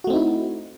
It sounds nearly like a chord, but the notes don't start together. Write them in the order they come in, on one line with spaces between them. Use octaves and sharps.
F#4 A3 C4 D#4 E4